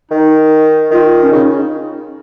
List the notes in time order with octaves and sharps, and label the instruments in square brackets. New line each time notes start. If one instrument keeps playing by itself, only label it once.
[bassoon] D#3 [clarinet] D#4
[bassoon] D#3 [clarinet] F4
[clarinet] C#4
[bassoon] C#3 [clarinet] D#4